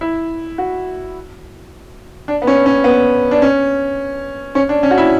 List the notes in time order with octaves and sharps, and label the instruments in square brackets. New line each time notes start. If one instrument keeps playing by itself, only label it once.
[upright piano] E4
F#4
D4
B3
C#4
C#4
B3
D4
C#4
C#4
D4
C#4
F#4
E4